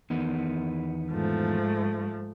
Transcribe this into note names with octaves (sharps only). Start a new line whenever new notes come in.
E2 D#3 B3
G#2 F3 A3